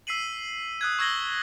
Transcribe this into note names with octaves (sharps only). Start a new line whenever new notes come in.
E6 B6 C7 D#7 F#7
D#6 F#6 G#6
C#6 E6 G#6 A#6 F#7 G7